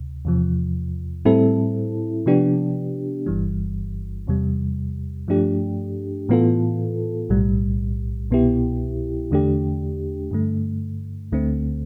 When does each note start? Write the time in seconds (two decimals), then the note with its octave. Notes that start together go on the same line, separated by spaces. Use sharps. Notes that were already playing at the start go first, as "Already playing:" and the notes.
Already playing: D2 C3
0.25 E2 C3 F3
1.25 A2 G3 C4 E4 A4
2.26 C3 F3 B3 D4 G4
3.26 G1 G2 E3 G3
4.27 E2 C3 G3
5.28 G2 F3 A3 D4 G4
6.29 A2 E3 B3 F4 A4
7.29 B1 A2 G3
8.30 C2 B2 B3 E4 G4
9.31 E2 D3 A3 D4 G4
10.31 G2 D3 A3
11.32 D2 D3 A3 C4